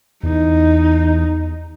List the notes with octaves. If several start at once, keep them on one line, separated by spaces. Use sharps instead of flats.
E2 D#4